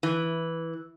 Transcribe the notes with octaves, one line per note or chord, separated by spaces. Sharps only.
E3